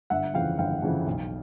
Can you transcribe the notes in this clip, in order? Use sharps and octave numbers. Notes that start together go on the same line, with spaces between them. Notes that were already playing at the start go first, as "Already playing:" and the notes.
G1 E5 F#5
F2 C#3 E3 F5 G5
G1 F5 G5
F2 C#3 E3
B1